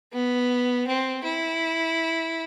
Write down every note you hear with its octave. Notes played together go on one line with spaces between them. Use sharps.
B3
C4
E4